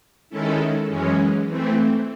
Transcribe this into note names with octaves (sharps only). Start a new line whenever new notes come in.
D#3 G#3 C#4 E4 A4
F#2 E3 G#3 C#4
E3 A3 C4